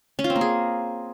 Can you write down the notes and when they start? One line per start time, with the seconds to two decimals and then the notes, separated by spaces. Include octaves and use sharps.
0.19 C#4
0.24 F4
0.30 C4
0.35 A#3
0.41 G#4